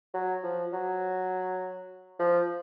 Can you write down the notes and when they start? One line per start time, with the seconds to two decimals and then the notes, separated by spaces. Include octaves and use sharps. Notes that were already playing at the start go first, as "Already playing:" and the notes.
0.14 F#3
0.43 F3
0.72 F#3
2.19 F3